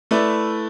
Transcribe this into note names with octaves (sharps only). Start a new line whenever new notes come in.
A3 E4 B4 D5